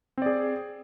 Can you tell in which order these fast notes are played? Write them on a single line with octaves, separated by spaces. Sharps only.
C4 D5 G#4